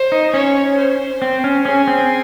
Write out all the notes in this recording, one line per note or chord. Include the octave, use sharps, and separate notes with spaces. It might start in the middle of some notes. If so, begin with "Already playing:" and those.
Already playing: C5
D#4
C#4 C#5
C5
C4
C#4
C#4 G#4
C4